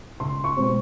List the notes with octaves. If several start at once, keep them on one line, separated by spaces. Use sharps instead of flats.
C#2 C6
C#6
B2 G#3 C4